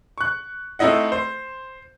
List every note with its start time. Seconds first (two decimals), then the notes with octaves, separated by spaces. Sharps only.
0.18 C#6 F#6
0.79 A3 C4 D#4 E4 D#5 F#5
1.12 C5